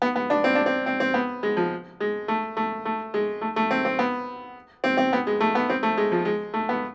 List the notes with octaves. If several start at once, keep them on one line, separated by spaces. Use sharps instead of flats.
B3
B3
D4
C4
D4
C4
C4
C4
B3
G#3
F3
G#3
A3
A3
A3
G#3
A3
A3
C4
C4
B3
C4
C4
B3
G#3
A3
B3
C4
A3
G#3
F3
G#3
A3
B3